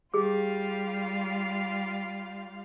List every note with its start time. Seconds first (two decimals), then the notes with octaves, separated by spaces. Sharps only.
0.14 G3 F4 G4 G#4 F5 D6